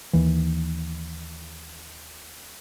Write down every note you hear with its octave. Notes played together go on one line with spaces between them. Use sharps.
D#2 E3